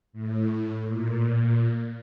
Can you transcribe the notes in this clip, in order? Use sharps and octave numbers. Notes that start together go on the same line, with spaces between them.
A2
A#2